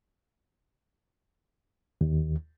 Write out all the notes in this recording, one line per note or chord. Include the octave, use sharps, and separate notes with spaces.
D#2